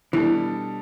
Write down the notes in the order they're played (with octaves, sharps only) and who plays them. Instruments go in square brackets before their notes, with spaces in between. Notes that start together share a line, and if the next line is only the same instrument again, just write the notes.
[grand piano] B2 G3 D4 A4 [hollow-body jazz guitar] E3